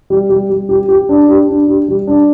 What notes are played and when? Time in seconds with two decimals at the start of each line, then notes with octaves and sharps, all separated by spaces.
0.10 G3
0.30 G3
0.50 G3
0.69 G4
0.88 G4
1.09 D4
1.29 G4
1.48 D4
1.68 G4
1.88 G3
2.07 D4